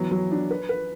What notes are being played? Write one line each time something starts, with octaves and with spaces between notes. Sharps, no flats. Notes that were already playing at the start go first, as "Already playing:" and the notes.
Already playing: E3 F#3 B3
F#3
D4
B4
B4